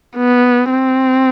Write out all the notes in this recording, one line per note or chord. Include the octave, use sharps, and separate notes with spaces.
B3
C4